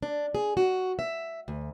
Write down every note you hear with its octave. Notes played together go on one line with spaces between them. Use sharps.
D4
G#4
F#4
E5
D2